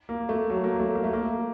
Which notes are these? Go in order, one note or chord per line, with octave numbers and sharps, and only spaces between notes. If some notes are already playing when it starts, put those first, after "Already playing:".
A#3
A3
F#3
A#3
A3
A#3
A3
A#3